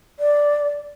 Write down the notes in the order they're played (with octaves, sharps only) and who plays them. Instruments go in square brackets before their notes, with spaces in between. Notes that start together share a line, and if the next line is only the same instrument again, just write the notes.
[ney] D5